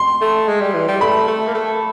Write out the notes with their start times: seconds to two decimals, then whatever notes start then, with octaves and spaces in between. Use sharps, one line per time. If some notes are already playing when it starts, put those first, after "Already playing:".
Already playing: C6
0.21 A3
0.48 G#3
0.61 G3
0.74 E3
0.88 G3
1.01 A3 B5
1.28 A3
1.47 A#3
1.55 A3